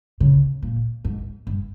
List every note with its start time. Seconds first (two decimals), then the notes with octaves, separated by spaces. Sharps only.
0.20 C#3
0.63 A#2
1.05 G#2
1.47 G2